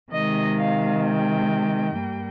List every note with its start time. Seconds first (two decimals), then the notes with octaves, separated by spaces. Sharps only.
0.12 C3 D#3 G#3 D#5
0.58 F5
1.04 G5
1.96 G2 G3 A#3